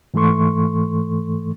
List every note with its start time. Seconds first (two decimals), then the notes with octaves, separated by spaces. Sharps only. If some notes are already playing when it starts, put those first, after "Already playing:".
0.14 G#2 E3 A3 A4 C6 C#6